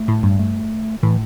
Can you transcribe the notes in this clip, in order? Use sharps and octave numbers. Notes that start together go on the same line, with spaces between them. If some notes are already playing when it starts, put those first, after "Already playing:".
Already playing: A3
A2
G2
A3
A2 E3